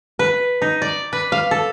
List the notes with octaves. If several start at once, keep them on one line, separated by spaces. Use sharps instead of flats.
B4
D#4
D5
B4
F5
A4